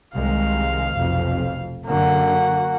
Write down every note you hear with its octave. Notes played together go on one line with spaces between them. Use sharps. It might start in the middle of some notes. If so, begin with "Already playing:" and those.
C2 D#3 G#3 F5
F1 B1 F2
F#2 D3 A#3 F#4